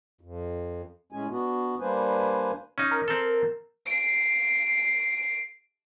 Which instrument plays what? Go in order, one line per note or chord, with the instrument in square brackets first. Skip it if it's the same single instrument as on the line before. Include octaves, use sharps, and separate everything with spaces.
[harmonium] F2
A2 G#3 C#4 G#5
B3 D4 F#4
G3 A#3 D4 B4 C5 G#5
[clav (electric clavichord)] C#4 D#4
[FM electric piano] A#4
[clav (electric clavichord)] C4 A4
[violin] C7 D7